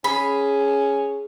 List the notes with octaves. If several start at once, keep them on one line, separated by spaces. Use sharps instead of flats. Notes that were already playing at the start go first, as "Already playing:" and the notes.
C#4 G#4 B5